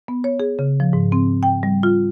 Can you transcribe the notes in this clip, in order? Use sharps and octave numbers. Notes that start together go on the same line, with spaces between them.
B3
C#5
G#4
C#3
F3
G#2
C4
G5
G3
F4